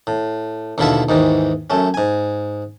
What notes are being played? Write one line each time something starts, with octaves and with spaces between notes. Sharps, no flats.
A2
D#2 B2 D3 E4 F4 E5
D#2 G#2 D#3 E3
F#2 A3 C#4
G#2 G#5